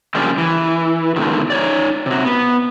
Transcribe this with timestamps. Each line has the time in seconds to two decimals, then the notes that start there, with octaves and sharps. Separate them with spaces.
0.15 C#3 F3 G3 A#3 D4
0.38 E3
1.16 G#2 B2 D3 D#3
1.50 D#4 C#5 D5
2.06 C3 F#4
2.25 B3